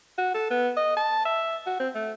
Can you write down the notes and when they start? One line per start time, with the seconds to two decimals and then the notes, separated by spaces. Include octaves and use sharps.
0.18 F#4
0.34 A4
0.50 B3
0.77 D#5
0.97 A5
1.25 E5
1.66 F#4
1.79 C4
1.95 A3